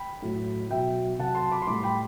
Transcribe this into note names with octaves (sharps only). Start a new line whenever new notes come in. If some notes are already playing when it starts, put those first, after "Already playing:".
Already playing: G5 B5
A2 F#3
B2 F#3 E5 G5
C3 F#3 F#5 A5
A5 C6
B5 D6
C6
A2 G3 B5 D6
G5 B5